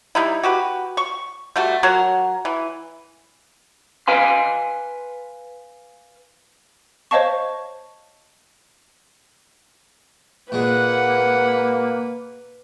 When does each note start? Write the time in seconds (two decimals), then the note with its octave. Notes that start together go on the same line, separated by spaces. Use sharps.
0.15 G3 D#4 E4
0.43 F#4 G4 B4
0.97 C#6
1.56 G3 A3 F#4
1.83 F#3 F#4 A#4
2.45 E3
4.08 B4 F5 G#5 C6
7.11 C5 C#5 D#5 F5 A5 C#6
10.52 A#2 G#3 A#3 B4 F#5